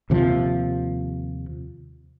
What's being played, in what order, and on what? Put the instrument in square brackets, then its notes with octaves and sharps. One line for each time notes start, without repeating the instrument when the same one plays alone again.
[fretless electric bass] D#2 C3 F3